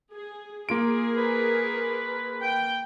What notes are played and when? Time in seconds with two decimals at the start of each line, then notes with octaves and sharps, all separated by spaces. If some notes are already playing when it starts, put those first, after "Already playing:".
0.13 G#4
0.69 A#3 F4 G#4 A#4 D7
1.17 B4
2.42 G5